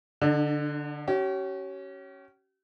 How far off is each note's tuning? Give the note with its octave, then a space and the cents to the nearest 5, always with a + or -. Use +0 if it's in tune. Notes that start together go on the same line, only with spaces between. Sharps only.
D3 +0 D4 +45
C#4 +0 G4 -45